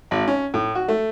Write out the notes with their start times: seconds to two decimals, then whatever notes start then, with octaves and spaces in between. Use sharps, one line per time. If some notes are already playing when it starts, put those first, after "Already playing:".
0.11 G#1
0.28 C#4
0.54 A2
0.75 F#4
0.88 A3